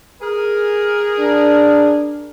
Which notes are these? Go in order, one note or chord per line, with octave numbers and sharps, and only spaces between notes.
G#4 A#4
D4